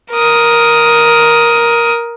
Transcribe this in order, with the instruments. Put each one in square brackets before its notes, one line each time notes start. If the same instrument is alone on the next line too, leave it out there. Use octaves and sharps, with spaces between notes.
[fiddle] A#4 D#6